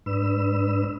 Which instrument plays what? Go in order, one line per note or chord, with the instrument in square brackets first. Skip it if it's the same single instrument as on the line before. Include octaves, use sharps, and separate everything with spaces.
[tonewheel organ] G#2 D4 B4 E6